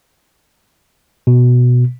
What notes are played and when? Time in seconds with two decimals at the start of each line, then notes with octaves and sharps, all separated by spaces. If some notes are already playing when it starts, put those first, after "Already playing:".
1.27 B2